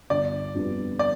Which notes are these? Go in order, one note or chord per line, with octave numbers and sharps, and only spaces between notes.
G1 D5
F2 D3 G3 B3
D5